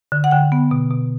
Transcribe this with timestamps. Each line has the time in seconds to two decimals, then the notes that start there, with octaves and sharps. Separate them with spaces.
0.12 D3
0.24 F#5
0.31 D3 G5
0.52 B3
0.71 B2
0.90 B2